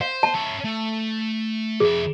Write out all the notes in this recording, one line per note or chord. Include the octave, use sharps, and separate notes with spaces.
C5 F5
A5
C#4 E5
A3
F2 G#4 E5